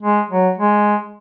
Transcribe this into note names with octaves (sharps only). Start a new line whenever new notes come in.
G#3
F#3
G#3